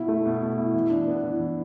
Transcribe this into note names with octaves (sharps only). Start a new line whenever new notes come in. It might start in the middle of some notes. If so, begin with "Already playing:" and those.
Already playing: B2 E4
A3
B2
B2
E4
E3
D4
B3
E3
E3